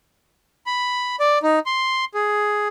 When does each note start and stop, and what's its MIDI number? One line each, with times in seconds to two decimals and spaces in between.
0.66 1.16 83
1.20 1.39 74
1.43 1.59 63
1.66 2.05 84
2.14 2.68 68